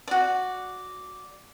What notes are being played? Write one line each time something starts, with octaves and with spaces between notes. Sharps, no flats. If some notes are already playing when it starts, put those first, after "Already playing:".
F#4 D5